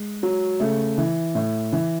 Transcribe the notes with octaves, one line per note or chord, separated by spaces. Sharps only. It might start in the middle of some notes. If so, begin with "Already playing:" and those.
Already playing: G#3
F#3
C#3 A3
E3
A2
E3